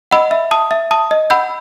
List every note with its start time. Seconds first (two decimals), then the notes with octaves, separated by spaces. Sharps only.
0.11 D#5 F#5 B5 E6
0.31 E5
0.51 A5 D#6
0.71 E5
0.91 A5 D#6
1.11 D#5
1.30 F#5 B5 E6 G6